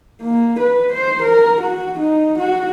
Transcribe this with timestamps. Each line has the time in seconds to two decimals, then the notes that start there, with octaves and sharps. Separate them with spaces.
0.22 A#3
0.59 B4
0.93 C5
1.23 A#4
1.62 F#4
1.99 D#4
2.39 F#4